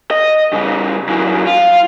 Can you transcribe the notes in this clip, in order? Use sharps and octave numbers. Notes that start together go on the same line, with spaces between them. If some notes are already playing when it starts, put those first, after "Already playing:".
D#5
C#3 G3
F#2 E3
F4